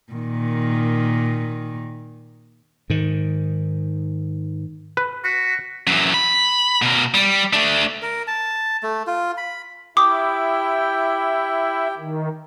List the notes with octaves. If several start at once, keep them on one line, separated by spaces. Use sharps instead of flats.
A#2 D#3
G#2 D#3
B4
F#4 B6
F#2 E3
B5
B2 A#4
G3
A3 D4
A#4
A5
A3
F4
B5
E4 G4 G5 D6 D#6
D#3